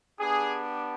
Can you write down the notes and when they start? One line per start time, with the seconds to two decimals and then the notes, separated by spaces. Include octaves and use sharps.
0.19 B3 D4 G4 G#4